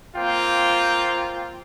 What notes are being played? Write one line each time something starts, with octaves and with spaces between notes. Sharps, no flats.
A#3 C4 F4 C5 G5